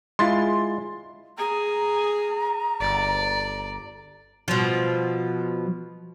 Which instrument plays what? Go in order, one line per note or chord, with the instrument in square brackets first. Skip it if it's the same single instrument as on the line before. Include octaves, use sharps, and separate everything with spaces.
[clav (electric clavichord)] G#3 E4 F4 [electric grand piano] C6 A6
[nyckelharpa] G#4 [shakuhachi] A#5
[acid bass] G1 [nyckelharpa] D5
[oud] B2 F3